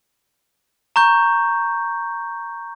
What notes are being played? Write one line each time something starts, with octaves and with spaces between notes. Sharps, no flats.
A#5 C#6 G6